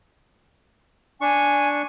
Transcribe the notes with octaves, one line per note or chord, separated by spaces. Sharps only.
D4 G#5 C#6